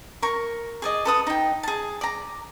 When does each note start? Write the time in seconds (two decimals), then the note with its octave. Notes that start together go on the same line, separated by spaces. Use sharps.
0.22 A#4 C#6
0.82 G#4 D5 D#5
1.05 A4 B4 D#6
1.27 D#4 G5
1.63 G#4 A5
2.01 D5 A#5